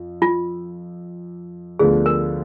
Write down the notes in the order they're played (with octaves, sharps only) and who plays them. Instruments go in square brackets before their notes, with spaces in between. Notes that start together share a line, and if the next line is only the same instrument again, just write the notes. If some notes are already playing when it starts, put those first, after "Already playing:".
Already playing: [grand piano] F2
[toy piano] F4
[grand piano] D2 D3 F3 B3 D4 [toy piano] G#4
[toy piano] A#4